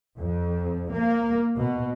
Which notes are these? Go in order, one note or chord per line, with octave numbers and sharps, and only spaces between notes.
F2
A#3
B2